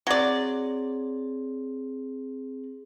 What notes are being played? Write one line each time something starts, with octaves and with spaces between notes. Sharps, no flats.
F#3 C4 G#4 D5